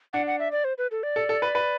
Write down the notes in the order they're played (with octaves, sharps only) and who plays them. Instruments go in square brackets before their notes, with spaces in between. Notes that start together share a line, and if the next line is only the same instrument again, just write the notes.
[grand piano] D4 [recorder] F#5
[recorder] F#5
E5
D5
C5
B4
A4
D5
[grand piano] A4
A4
B4
B4